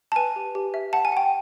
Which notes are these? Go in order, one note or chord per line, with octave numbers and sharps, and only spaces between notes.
A5
B4 G#5
G4
G4
E5
F#5 A5
G#5
F#5 G5